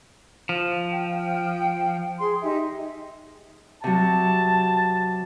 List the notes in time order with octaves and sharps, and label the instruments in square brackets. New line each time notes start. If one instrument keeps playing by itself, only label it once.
[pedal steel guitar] F3
[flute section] G5
G#4 C6
D#4 G4 E5
[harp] C3 F#3 [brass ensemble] A5